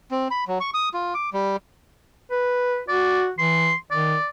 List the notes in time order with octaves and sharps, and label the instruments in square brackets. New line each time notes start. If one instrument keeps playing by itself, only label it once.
[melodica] C4
B5
F#3
C#6
D#6
F4
D6
G3
[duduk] B4
[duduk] F#4 [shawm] D5
[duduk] E3 [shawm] C6
[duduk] D#3 [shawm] D5